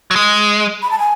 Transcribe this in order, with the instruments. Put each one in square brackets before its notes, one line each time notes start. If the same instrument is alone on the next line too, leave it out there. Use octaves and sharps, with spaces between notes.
[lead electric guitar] F#3
G#3
[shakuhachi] B5
A5
G#5